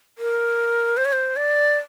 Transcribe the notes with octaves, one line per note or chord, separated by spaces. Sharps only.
A#4
C5
C#5
C5
D5